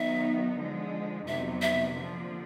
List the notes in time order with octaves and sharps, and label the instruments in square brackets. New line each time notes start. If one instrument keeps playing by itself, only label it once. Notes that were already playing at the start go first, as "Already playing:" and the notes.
Already playing: [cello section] D#3 F#3 B3 D#4 [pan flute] E5
[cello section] D3 F3 G#3
[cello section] F2 C3 D#3 F#3 B3 [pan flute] E5
[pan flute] E5
[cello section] D3 F3 A#3